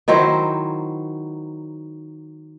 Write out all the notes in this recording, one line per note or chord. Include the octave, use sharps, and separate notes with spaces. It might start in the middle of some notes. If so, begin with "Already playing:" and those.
D#3 F#3 E4 C5